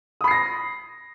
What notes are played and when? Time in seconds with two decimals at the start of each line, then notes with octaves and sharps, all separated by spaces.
0.21 D#6
0.24 B5
0.28 C7
0.31 A#6